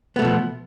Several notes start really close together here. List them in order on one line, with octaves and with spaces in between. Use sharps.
B3 A3 B2 F3